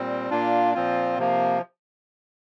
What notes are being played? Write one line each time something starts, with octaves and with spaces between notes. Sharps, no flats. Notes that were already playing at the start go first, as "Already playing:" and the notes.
Already playing: A#2 G3 C4
A#2 A#3 D4 F4
A#2 F3 C4 F4
C3 F3 A#3